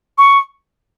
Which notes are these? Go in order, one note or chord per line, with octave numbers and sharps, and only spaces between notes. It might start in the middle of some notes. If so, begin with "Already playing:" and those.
C#6